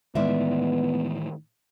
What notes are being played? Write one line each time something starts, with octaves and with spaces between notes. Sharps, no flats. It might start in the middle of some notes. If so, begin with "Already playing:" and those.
A2 D#3 E3 G#3 B3 D5 E5